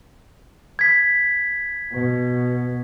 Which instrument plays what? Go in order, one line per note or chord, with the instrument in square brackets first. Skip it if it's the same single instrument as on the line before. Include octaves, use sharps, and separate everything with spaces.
[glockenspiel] G#6 B6
[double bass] B2